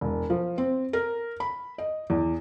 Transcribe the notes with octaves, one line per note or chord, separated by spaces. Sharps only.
E1
F3
C4
A#4
B5
D#5
E2